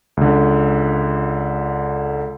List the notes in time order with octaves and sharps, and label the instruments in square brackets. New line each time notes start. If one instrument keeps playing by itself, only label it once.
[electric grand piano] C#2 D3